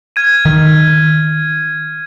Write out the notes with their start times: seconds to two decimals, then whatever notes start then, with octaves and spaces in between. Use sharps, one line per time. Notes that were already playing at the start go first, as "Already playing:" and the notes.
0.16 F6 G#6 D#7
0.45 D#3